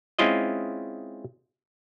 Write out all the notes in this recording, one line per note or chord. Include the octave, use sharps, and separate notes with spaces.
G#3 C4 C#4 E4 F4 D#5